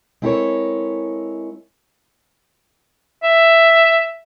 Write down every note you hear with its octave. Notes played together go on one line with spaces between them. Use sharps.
G#3 C4 E4 A4 A#4 C#5
E5